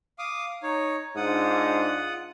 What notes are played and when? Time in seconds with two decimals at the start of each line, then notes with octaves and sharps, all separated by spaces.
0.19 F5 D6 D#6
0.63 D#4 C#5
1.17 G#2 D4 F4 F#5 D#6